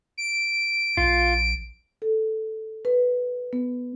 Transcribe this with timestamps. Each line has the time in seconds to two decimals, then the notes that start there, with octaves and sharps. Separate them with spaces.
0.18 D7
0.97 A#1 F4
2.02 A4
2.85 B4
3.53 B3